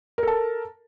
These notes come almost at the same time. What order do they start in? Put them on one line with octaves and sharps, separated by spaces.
A#4 A4 A5